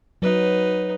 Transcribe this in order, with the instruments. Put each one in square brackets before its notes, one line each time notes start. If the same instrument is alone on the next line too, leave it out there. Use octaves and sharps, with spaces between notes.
[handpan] F#3 [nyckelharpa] D#4 B4